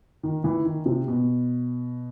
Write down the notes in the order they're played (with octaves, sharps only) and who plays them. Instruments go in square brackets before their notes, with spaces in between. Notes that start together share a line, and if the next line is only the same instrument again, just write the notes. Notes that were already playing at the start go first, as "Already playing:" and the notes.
[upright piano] D#3
E3
D#3
C3
B2